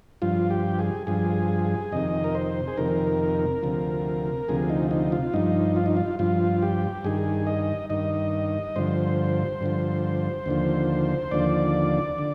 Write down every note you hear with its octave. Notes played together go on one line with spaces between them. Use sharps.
G2 F3 F4
G4
G#4
G2 F3 G#4
F2 C3 D#3 D#5
A#4
C5
G#4
F2 C3 D#3 A#4
D2 C3 F3
D2 C3 F3 G#4
D#4
D#4
F4
G2 F3 D#4
F4
D#4
F4
G2 F3 F4
G4
G2 D#3 G#4
D#5
G2 D#3 D#5
G2 D3 F3 C5
G2 D3 F3
D#2 D3 F3
D#2 D3 F3 D5
D3